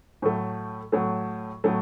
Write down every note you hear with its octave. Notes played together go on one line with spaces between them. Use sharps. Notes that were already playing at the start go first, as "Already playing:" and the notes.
A2 F#3 A3
A2 F#3 A3
A2 F#3 A3